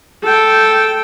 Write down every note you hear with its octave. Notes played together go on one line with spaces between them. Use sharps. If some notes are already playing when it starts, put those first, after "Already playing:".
A4 G5